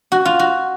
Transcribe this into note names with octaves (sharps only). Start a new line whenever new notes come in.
F#4
F4
F#4